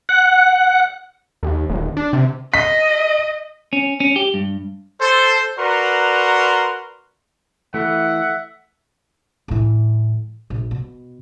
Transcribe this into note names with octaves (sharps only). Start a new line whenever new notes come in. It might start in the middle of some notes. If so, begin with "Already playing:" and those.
F#5
D#2
D#1
D4
C3
D#5 B6
C#4
C#4
G4
G2
A4 C5
F#4 A#4 B4 D5 A#5 C6
E3 A3 E5 F#5
A2 E3
A#1
B2